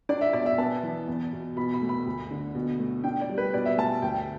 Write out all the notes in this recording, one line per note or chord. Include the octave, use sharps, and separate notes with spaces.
D4 D5
E5
B2 D5
E5
B3 A5
E3
E2
B2
B2 B5
B5
A3
B5
D2
D3
B2
A3
D4 G5
D5
G3
B4
B2 D5
E5
A3 A5
D2 G5